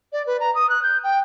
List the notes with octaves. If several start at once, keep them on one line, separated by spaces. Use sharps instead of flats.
D5
B4
A#5
D#6
F#6
G6
G5